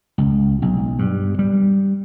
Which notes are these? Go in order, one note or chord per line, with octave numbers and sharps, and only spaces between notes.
C#2
B1
G2
G3